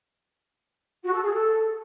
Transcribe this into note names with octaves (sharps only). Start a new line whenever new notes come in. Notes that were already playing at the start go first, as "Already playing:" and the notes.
F#4
A4
G#4
A4